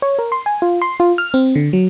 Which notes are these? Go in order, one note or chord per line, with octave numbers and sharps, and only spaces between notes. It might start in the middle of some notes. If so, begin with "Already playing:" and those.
C#5
A#4
C6
G#5
F4
C6
F4
F6
C4
D3
F#3